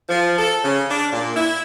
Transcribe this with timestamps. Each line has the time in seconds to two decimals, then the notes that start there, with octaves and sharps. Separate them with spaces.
0.09 F3
0.37 A4
0.64 C#3
0.90 D4
1.12 A#2
1.36 E4